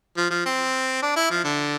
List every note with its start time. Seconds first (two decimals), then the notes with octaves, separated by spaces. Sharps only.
0.17 F3
0.31 F3
0.46 C4
1.03 D4
1.16 E4
1.31 F3
1.45 D3